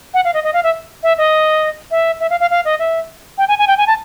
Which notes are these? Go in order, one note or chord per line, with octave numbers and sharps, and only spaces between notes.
F#5
F5
D#5
D#5
F5
E5
E5
D#5
E5
E5
F5
F5
F5
D#5
E5
G5
G#5
G#5
G5
G#5
A5